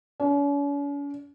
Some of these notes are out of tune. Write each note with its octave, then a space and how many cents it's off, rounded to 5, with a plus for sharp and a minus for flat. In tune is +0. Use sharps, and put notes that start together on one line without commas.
C#4 +45